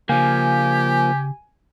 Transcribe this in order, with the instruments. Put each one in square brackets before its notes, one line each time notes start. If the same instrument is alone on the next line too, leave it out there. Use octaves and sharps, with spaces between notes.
[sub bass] C#3 [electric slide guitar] F3 A#3 [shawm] G4 [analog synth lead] G#5